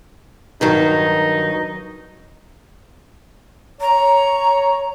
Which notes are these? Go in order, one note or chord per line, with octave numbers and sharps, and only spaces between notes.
G2 D#3 F#3 D#4
C#5 A#5